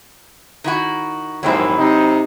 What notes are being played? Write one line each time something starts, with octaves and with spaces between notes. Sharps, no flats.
D#3 E4 F#4
A#1 D#2 G#2 F#3 C4 E4
C3 D#4